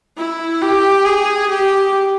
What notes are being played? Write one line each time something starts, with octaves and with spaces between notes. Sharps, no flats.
E4
G4
G#4
G4